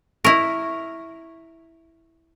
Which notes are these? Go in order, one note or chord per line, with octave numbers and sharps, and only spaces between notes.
E4 A#4 C#6